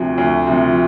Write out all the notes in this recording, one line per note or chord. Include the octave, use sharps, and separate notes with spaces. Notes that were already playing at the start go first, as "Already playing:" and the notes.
Already playing: D2 C3 F3
D2
C3 F3